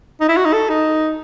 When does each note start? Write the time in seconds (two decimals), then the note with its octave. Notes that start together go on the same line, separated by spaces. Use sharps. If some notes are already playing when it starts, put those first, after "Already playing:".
0.21 D#4
0.29 E4
0.37 F#4
0.45 D#4
0.53 A4
0.69 D#4